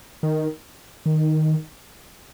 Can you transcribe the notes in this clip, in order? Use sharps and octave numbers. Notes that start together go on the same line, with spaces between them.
D#3
D#3